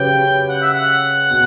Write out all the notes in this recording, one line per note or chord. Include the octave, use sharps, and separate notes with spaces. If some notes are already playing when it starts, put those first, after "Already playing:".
Already playing: C#3 F#3 C#4 G4 B4 G5
F#5
E5
F#5
B2